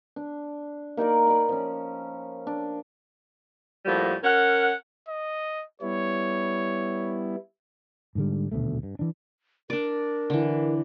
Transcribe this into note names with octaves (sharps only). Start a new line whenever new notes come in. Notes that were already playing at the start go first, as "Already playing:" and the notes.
D4
A#3 D#4 A#4 D5
D5 B5
F3 C#4
D4
A2 F3 G3 A#3 F#4
C#4 A#4 F#5
D#5
G3 B3 E4 C#5
G#2 D3 G3
D#1 D2 B2 A3
G2
E3 D4
D4 A#4 D5
D3 E3